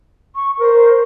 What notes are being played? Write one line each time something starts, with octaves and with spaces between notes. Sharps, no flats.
C#6
A#4 C5